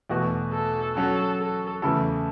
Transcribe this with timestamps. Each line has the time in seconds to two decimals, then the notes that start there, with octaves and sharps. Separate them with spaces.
0.10 E2 B2 A3 F#4
0.53 A4
0.95 F#3 C#4 F#4 A4
1.39 A4
1.82 E2 C#3 A3 E4 A4